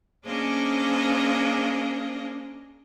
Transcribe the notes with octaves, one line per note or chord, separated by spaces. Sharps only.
A#3 C#4 D4 G#4 C5 D#5